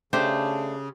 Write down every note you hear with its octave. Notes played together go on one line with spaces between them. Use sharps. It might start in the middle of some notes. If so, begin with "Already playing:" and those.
C#3 A3 D4 G4 C5